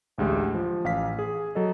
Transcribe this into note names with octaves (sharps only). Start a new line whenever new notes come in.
A1 D2 G#3 G4
F3
A1 F5 B6
G#4
F#3 A4 D#5